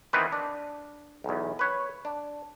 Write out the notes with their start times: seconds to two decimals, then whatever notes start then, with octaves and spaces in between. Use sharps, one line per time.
0.13 D#3 E3 B3 C4 B4
0.32 D4
1.24 B1 E2
1.59 B4 C#5
2.05 D4